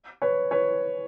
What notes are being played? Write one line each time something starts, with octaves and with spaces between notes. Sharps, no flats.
B4 C#5
B4 C#5